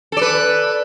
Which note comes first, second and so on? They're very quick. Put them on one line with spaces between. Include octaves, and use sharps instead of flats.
A4 D5 B4